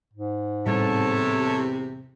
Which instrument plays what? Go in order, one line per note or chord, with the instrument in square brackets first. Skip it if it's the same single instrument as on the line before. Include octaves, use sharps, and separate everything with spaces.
[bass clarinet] G#2
[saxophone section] E2 C3 [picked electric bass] A2 G3 [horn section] A4 C#5 A5